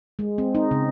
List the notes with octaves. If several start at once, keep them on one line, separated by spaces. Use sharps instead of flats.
G#3
C4
D#4
C#3